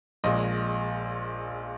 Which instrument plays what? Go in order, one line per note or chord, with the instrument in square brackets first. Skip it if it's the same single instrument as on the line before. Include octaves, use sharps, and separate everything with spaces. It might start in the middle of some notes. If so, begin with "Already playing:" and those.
[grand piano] A#1 A#2 G#3 D#5